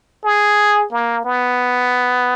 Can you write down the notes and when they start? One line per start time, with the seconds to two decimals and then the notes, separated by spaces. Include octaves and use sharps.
0.25 G#4
0.92 A#3
1.25 B3